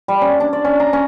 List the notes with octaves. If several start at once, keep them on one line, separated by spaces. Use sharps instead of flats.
G3
C#4
D4
D5
C#4
A#5
C#4